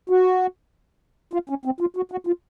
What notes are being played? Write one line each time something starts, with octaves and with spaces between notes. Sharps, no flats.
F#4
F4
C#4
C4
F4
F#4
F#4
F4